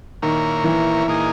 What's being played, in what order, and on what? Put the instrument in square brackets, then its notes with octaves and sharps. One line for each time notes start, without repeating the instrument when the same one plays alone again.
[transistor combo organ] A#2 A#3 E4 A#4 C#5 [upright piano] D#3
[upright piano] E3
[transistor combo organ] A#2 A#3 D#4 G#4